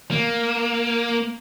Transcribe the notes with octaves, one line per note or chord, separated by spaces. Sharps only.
A#3